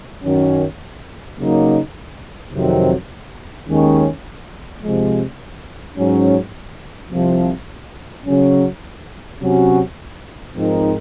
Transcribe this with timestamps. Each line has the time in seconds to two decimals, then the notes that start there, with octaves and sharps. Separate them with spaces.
0.24 F#2 D#3 F#3 C#4
1.38 C#3 F#3 A#3 D#4
2.53 F2 C3 D#3 F#3 C4
3.67 D#2 D#3 G#3 C#4
4.82 C3 F3 G#3
5.97 G#2 F#3 C#4
7.11 C2 C3 F3
8.25 C#3 F#3 C#4
9.40 C3 F#3 C#4 F#4
10.54 G#2 F3 C4 D#4 A#4